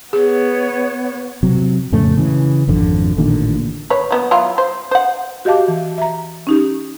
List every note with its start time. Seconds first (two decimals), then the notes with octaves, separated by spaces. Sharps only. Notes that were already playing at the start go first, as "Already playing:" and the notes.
0.13 B3 G#4 C#5
1.43 C3 F#3
1.92 F2 A2 C#3 A3
2.17 C#3 E3
2.68 G#1 F2 D3
3.17 A1 A#2 D3 D#3
3.90 B4 C#5
4.11 F#3 B3 F#4
4.31 F#3 E4 F4
4.58 C5
4.91 C5 F#5
5.45 F#4 G4 D#5 F5 A5 D6
5.68 E3
5.98 E5 A#5
6.47 C#4 D#4 G4